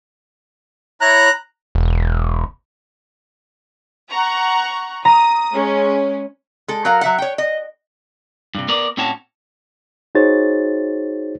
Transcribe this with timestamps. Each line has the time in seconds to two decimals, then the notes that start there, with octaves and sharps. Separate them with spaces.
1.01 E4 C#5 A#5 F#6
1.75 E1
4.10 F#5 A#5 C#6
5.05 A#5 D#6
5.53 G#3 C#4
6.68 G#3 A4
6.85 F#3 F#4 A#4 F5
7.01 F#3 E5 F#5
7.18 C#5 G5
7.38 D#5
8.55 G2 C3
8.68 B3 A#4 D5
8.97 A2 C4 C#4 F#4 C#5 A5
10.15 D#4 F#4 G#4 C5 C#5 A6